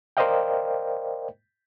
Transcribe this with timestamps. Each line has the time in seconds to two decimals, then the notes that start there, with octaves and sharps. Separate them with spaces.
0.17 A#4 C5 D5 D#5 F5 G5